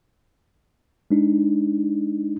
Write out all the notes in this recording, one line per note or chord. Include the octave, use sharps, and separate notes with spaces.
G#3 D4 D#4